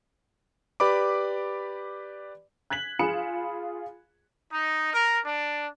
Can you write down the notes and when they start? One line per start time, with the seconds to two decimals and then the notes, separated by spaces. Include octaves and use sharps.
0.80 G4 B4 D5 B5 D6
2.70 F#6 G#6 B6 F#7
2.99 F4 G#4 B5 C#7 E7
4.51 D#4
4.93 A#4
5.24 D4